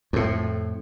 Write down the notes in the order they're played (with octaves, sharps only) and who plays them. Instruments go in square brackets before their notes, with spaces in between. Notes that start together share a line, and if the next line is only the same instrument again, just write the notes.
[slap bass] F2 A2